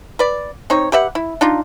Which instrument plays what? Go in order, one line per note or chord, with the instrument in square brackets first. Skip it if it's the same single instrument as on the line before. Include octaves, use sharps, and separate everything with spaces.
[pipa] B4 D5
C4 D#4 C#5
G4 B4 E5 F#5
E4
D4 D#4 F4